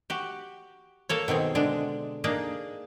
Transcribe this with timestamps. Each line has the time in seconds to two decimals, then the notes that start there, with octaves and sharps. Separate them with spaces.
0.10 F#4 G4
1.09 A#3 A4 C#5
1.28 B2 D#3 C4 G#4
1.55 D3 G#3 D4
2.24 A#3 D4 D#4 G#4